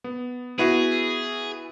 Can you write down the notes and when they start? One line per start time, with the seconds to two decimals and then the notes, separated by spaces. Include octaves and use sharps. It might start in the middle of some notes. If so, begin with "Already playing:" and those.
0.04 B3
0.59 B3 E4 F#4 G#4